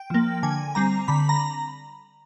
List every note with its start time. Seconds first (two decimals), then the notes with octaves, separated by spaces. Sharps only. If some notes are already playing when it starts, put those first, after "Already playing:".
Already playing: G5
0.10 F3 A#3
0.43 D3 G#5
0.75 G3 C4 A#5
1.08 D3 B5
1.29 A#5